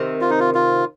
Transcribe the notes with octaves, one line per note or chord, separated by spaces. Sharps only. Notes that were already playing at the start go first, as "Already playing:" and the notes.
Already playing: C3 D#3
F4
D#4
F4
F4